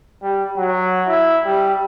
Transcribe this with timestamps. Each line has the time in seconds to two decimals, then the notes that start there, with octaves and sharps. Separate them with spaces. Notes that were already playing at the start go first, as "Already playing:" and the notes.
0.23 G3
0.57 F#3
1.08 E4
1.45 G3